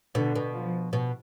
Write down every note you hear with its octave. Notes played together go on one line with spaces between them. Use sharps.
B2 D3
B2
F3
B2